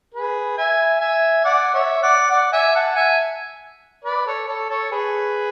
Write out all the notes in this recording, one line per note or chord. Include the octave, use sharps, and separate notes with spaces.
G#4 B4
E5 G#5
E5 G#5
D5 F#5
C#5 E5
D5 F#5
D5 F#5
E5 G#5
F#5 A5
E5 G#5
B4 D5
A4 C#5
A4 C#5
A4 C#5
G#4 B4